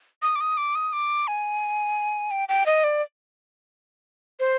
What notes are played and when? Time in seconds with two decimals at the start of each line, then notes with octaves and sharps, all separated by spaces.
0.22 D#6
0.36 D6
0.41 D#6
0.57 D6
0.75 D#6
0.93 D6
1.28 G#5
2.31 G5
2.49 G5
2.66 D#5
2.84 D5
4.40 C5